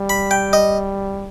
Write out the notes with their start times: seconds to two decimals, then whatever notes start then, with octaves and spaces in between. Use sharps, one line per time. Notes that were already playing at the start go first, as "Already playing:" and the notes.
Already playing: G3
0.09 B5
0.31 G5
0.53 D#5